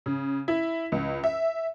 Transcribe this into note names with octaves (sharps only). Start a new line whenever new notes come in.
C#3
E4
C#2
E5